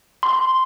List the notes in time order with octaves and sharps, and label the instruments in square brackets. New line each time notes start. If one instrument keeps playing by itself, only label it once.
[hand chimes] C6